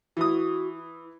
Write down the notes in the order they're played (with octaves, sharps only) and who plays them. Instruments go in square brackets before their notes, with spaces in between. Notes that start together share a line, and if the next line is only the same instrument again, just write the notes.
[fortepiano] E3 D#6 [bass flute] F#4
[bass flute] E4